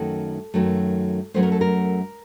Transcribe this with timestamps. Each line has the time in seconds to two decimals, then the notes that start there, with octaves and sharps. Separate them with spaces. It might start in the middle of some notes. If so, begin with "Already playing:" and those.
Already playing: F#2 D#3 F#3 A3 A4
0.54 F#2 D#3 F#3 A3
1.34 F#2 D#3 F#3 A3 C5
1.43 A#4
1.52 A4
1.61 A#4